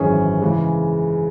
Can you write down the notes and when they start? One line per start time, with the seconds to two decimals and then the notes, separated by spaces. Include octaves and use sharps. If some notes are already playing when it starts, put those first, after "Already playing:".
Already playing: G#1 F#2 E3 C#4 G#4
0.41 C#3 E3 G#3